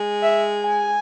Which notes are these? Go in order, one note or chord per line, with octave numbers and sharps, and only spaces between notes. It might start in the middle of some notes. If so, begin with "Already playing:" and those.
Already playing: G#3
E5
G#5